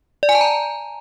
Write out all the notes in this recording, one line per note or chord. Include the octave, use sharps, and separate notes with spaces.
D5
G#5
A5
A#5